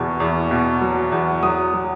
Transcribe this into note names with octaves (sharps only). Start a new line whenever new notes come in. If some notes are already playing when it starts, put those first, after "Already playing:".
Already playing: E2 B2 C#6
E2
B2
F#3
E2
F#3 D#6
F#3